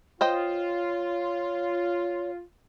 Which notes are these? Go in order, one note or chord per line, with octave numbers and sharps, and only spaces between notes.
F4 C5 C#5 D#5 G5